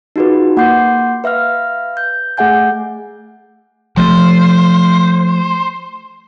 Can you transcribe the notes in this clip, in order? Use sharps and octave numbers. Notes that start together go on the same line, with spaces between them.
D#4 F4 F#4 G#4 B4
A#3 F#5 C6 D6 G6 C7
B4 E5 F5 F6
G6
A3 G#4 E5 F#5 G#5 G6
F3 A3 C5